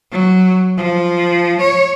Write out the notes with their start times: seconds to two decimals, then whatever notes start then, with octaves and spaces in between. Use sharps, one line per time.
0.12 F#3
0.78 F3
1.61 C#5